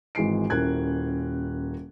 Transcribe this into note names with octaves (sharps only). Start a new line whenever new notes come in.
G#1 E3 G#3 C7 D7
D#1 C#4 E4 A#4 F#6 G#6